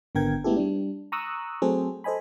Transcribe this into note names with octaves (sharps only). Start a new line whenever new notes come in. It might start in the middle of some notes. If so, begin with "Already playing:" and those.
G#1 D3 B3 A#4 G5 G#6
G#3 A3 B3 E4 G4 A4
G3 D4
A#5 C#6 D#6 E6 F#6
F#3 A3 C4 G#4 A4 C5
A4 C5 D#5 G#5 B5